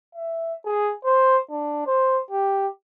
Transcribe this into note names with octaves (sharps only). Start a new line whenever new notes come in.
E5
G#4
C5
D4
C5
G4